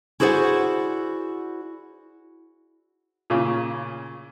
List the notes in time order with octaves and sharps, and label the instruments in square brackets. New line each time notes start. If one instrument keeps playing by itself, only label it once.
[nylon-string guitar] E4 F#4 G#4 C5 D5 F#5
[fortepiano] A#2 C#3